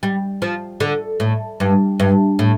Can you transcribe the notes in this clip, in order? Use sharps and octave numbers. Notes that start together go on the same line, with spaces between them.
G3
F3
D3
A2
G2
G2
A2